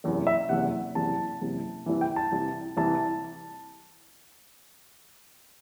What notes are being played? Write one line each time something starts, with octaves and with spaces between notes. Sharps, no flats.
F#1 E2 C3
E5
F#1 E2 C3 F#5
F#1 E2 C3 A5
F#1 E2 C3
C2 C3 E3
G5
A5
C2 C3 E3
C2 C3 E3 A5